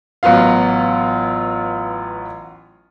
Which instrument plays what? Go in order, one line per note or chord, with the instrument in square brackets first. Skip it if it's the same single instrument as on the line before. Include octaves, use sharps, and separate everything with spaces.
[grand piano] A1 F#3 B3 F4 F5